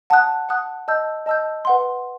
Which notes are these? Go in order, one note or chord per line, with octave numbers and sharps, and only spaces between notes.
F#5 A5 D#6 F#6
F#5 A5 D#6 F#6
D#5 A5 E6 G6
D#5 A5 E6 G6
B4 F#5 C6